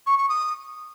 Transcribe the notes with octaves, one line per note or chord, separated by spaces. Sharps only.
C#6
C#6
D#6